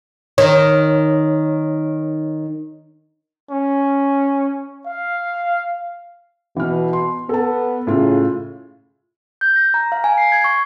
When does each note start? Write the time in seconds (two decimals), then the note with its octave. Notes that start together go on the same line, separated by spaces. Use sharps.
0.38 D#3 C#5
3.51 C#4
4.86 F5
6.56 B2 E3 F6
6.93 C6
7.29 B3 A4 A5
7.87 A2 C#3 F4
9.41 G6
9.56 A#6
9.74 A#5
9.92 F5
10.04 G#5
10.18 C7
10.32 G#6
10.44 C#6